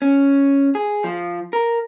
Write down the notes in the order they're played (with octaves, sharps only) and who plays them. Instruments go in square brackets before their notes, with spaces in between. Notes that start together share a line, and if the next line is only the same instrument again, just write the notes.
[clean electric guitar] C#4
G#4
F3
A#4